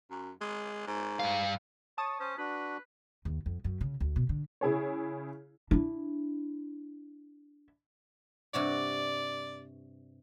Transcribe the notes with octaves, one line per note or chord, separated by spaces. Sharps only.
F#2
G#3
G#2
G2 F5
C#5 A5 D#6
C#4 C5
D4 F#4 B4
D#2
F2
F#2
C#3
D2
B2
D3
C#3 E4 G#4 C#5
D4 E4
G2 C3 F#4 D5